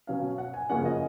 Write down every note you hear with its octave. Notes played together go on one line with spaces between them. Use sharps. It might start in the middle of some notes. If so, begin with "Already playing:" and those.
B2 F#3 C#4 F5
F#5
G#5
F#2 C#3 F3 A#3 C#4 F#5
D#5